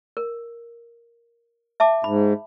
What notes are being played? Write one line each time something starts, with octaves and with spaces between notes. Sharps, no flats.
A#4
E5 A5 D6
G#2 B5